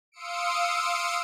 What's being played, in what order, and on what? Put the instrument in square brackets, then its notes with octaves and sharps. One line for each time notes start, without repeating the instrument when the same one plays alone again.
[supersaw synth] F5 C6 D#6 E6 C#7 D7